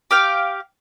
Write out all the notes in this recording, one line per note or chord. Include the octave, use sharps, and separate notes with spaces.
G4 F5 G5